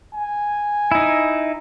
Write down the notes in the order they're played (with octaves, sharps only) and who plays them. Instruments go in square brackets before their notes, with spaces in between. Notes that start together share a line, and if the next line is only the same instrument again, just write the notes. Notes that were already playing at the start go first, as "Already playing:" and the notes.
[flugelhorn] G#5
[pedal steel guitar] D#4 E4